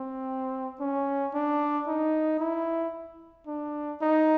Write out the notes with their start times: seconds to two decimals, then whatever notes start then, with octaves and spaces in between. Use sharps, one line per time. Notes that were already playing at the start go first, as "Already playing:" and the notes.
Already playing: C4
0.80 C#4
1.34 D4
1.87 D#4
2.40 E4
3.47 D4
4.01 D#4